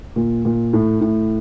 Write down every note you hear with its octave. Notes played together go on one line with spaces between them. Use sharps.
A#2
A#2
A2
A2